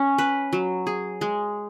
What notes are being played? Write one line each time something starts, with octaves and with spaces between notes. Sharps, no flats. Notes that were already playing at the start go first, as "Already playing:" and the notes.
Already playing: C#4
B4
F#3
G#4
G#3